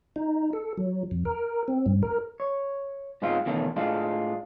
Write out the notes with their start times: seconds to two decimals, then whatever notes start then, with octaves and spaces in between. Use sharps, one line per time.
0.16 D#4
0.53 A4
0.77 F#3
1.11 F2
1.25 A#4
1.68 C4
1.86 G2
2.03 A#4
2.40 C#5
3.22 G#2 G#3 B3 C4 F4
3.46 E2 B2 D3 D#3 A3 C#4
3.76 A2 G#3 D4 F4